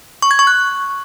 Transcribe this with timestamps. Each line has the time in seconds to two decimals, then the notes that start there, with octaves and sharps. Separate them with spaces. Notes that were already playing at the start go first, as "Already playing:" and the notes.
0.22 C#6
0.31 G#6
0.39 C#6
0.47 F#6